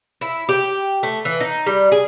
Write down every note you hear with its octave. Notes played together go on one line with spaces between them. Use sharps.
E4
G4
A3
E3
D#4
G3
G#4